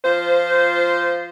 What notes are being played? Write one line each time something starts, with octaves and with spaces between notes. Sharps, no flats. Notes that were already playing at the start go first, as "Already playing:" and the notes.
F3 F4 C5